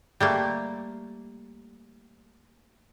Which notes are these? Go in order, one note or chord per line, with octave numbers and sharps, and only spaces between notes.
G3 A3 A#3